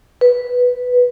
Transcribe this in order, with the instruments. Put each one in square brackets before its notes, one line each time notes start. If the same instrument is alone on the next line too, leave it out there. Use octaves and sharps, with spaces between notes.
[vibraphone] B4